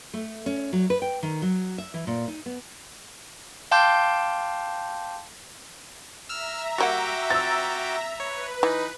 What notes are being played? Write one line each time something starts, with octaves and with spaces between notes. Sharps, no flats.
A3
C#4
F#3
B4
G5
D#3
F#3
E5
E3
A#2
D#4
B3
F5 G5 A5 C6 D6 G6
E5 A#5 E6 F6
G3 A#3 F#4 F#5 G5 D6
F3 C4 E6 A6
B4 C#5
E3 D#4